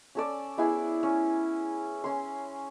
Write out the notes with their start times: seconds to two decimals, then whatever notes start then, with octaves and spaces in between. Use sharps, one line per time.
0.15 C#4 A4 D5
0.58 B3 E4 G#4 G#5
1.03 C#4
2.04 C#4 C6